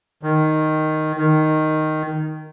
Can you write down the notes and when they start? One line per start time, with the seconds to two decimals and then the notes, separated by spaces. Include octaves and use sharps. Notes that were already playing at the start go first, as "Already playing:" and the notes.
0.23 D#3
1.18 D#3